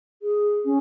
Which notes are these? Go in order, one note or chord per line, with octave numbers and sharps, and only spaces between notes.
G#4
C#4